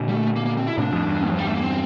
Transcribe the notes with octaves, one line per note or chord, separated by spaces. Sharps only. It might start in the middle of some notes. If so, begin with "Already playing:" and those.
Already playing: A#2 D3
G3
A3
A#3
A#3
C4
E4
A2 C3 D4
F2 A2
E2 G2
F3
G3
A3
A#3
C4